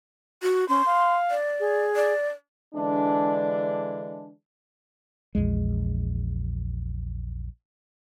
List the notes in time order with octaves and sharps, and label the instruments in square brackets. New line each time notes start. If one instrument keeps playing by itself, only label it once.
[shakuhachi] F#4
[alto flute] C#4 [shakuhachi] C6
[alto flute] F5
[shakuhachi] D5
[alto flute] G#4
[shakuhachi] D5
[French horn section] D3 E3 G#3 D4
[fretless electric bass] A#1 E2 G#3